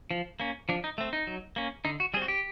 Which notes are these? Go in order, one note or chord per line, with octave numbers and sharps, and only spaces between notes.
F3
A#3 C#4
F3 D4
D#4
A3 C4
D#4
F#3
A#3 C#4
D3 D#4
F#4
G3 C4 G#4
F#4
G4